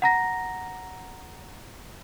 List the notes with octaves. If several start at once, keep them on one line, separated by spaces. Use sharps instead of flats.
F#5 A#5 A#6